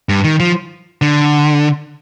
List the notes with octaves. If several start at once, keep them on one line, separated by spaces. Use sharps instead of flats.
G2
D#3
F3
D3